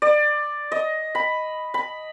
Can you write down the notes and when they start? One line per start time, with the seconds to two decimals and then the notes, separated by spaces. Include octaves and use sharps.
0.02 D5
0.72 D#5
1.15 B5
1.74 B5